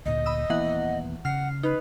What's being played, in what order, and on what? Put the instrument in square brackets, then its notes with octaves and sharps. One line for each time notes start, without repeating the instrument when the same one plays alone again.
[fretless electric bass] D2 A#2 [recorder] D#5
[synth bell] B5 D#6 E6
[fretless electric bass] D#1 A#3 B3 [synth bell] E3 F#5
[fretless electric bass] C#3 [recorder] F#5 [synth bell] F6 C7
[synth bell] D#4 [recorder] B4